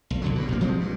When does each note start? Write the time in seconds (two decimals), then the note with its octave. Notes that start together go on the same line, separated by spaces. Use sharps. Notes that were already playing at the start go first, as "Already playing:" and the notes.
0.10 B1
0.22 B1 D3 F#3
0.36 G2 B2
0.48 A#1 C3 A#3
0.61 F3 G3 G#3 C4
0.80 G2